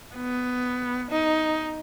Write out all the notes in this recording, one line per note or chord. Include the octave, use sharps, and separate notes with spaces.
B3
D#4